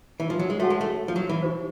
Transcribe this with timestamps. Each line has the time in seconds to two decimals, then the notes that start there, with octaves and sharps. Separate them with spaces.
0.20 E3
0.30 F3
0.39 F#3
0.50 G#3
0.60 A3 F#4 A4 C#5 F#5 A5
0.70 G#3
0.81 A3
1.08 F3
1.16 F#3
1.29 E3
1.42 D#4 G4 C5